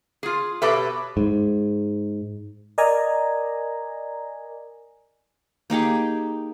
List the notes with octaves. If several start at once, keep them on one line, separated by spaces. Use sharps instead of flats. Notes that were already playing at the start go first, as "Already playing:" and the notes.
F4 G#4
B2 G4 A4 B4 C#5 E5
G#2
A#4 D5 D#5 G#5 A#5
A#3 D#4 G4 G#4